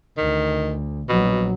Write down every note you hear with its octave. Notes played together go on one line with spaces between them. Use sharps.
D2 D#3
A#1 B2 F#3